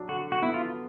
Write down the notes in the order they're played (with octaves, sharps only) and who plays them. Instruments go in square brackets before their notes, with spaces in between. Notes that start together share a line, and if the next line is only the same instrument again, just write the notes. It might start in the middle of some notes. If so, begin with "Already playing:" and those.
Already playing: [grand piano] F#3 D4
[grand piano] D3 [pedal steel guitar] F#4
[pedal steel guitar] F#4
[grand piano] B3 [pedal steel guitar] E4
[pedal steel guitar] F4